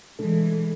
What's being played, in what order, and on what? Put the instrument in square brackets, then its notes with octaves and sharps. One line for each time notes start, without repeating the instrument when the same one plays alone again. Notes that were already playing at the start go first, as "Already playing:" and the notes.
[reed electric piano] B2 A3 D4 A4 [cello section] E3 G#3